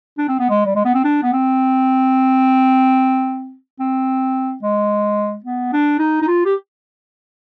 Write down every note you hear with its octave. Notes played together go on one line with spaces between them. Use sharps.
D4
C4
B3
G#3
G3
G#3
B3
C4
D4
B3
C4
C4
G#3
B3
D4
D#4
D#4
F4
G4